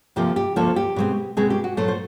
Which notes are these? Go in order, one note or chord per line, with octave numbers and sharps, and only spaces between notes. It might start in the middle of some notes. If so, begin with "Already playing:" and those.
D2 C3 F3 A#3 G4
G4
D2 C3 F3 A#3 A4
G4
B2 G#3 C4
B2 G#3 C4 G#4
G4
F#4
A#2 F#3 A3 C5
C5